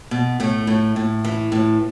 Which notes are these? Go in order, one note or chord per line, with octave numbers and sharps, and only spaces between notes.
B2
A2 A3
A2
A2
E3
A2